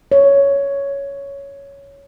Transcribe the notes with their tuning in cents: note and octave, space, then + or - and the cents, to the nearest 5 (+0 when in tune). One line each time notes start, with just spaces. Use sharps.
C#5 +10